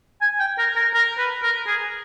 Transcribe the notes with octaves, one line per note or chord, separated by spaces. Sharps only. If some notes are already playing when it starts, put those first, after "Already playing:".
G#5
G5
A#4
A#4
A#4
B4
A#4
G#4